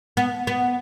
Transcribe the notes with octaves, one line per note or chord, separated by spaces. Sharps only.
B3
B3